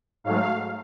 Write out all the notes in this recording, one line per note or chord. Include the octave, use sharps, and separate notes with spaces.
G#2 F#3 A3 F5